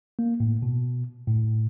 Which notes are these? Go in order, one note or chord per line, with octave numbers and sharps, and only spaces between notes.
A#3
A2
B2
A2